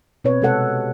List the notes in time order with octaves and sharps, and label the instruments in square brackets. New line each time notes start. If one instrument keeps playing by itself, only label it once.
[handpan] B2 C4 B4 C#5
C3 G#3 A4 F#5